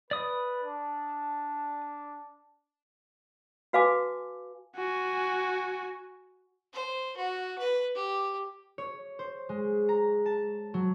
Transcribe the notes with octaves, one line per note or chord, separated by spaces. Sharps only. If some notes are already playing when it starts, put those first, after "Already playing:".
B4 D5 D#6
D4 A5
F#4 B4 F5 G#5 A5 D6
F#4 G#5
C5
F#4
B4
G4
C#5
C5
G#3
A#5
A5
F#3